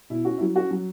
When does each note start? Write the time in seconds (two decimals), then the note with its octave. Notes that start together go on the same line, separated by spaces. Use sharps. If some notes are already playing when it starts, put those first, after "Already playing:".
0.10 B2 E4
0.25 C#4 F#4
0.38 E4
0.41 F#3
0.56 C#4 F#4
0.71 F#3